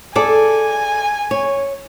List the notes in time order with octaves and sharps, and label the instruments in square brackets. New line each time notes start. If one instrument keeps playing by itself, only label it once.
[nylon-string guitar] G#4 A4 D5 [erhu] G#5
[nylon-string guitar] C#5